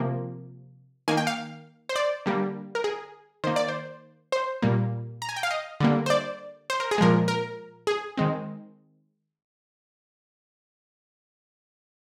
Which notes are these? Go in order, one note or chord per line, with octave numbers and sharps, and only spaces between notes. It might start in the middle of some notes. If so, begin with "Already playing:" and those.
Already playing: C3 F3 A#3
D#3 A#3 G#5
G5
F5
C5
D5
D3 G3 A#3
A#4
G#4
D#3 A#3 C5
D5
C5
C5
A#2 G3 A#3
A#5
G#5
G5
F5
D#5
D3 G3 A#3
C5
D5
C5
A#4
G#4
A#2 F3 G#3 A#4
A#4
G#4
D#3 G#3 C4